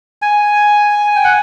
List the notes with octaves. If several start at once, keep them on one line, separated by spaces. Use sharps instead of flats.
G#5
G5
F#5